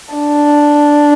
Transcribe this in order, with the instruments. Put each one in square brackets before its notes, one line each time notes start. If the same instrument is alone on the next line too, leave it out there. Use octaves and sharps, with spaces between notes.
[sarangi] D4